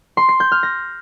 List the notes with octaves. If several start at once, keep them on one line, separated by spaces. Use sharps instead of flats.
C6
C7
G6
F6
A#6